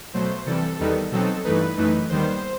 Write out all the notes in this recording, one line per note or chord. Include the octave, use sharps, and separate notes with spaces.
B2 F#3 A3 C5
C3 E3 G3 A4
E2 D#3 G3 B3 D#4
B2 F#3 C4 D#4 A4
G2 E3 A3 D#4 B4
F#2 E3 A3 D#4
D#2 D#3 G3 B3 C5